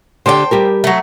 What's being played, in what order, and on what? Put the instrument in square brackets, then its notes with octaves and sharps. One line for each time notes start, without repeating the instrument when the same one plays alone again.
[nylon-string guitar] D3 G4 D5 [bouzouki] C5 G5
[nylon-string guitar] G3 G4 A#4
[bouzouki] F#3 A3